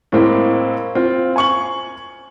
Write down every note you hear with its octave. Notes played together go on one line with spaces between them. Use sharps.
A2 G#3 A#3 C4 E4
C4 F4
G#5 C#6 F#7